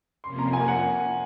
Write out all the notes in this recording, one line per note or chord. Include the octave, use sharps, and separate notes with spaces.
F2 C3 F3 A#3 C#4 C6
A#5
G#5
F#5